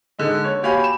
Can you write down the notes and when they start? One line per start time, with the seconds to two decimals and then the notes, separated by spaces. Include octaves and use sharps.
0.19 D3 G#3 D#4
0.44 C#5
0.63 F#4 G4 C#5 F5 G#5 B5
0.84 E7